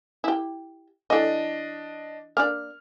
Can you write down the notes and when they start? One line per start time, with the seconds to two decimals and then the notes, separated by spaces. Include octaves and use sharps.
0.24 E4 G4
1.10 E3 A3 D4 D#5
2.37 A#3 D4 D5 F6